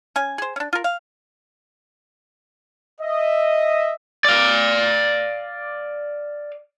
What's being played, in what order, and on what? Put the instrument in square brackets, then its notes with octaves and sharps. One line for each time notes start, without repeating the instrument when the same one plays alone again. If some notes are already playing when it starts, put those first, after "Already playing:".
[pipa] C#4 G#5
G#4 C5
C#4 D4
F4 A#4
F5
[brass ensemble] D#5 E5
[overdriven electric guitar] D5 F5